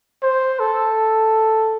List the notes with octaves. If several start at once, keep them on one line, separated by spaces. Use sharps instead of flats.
C5
A4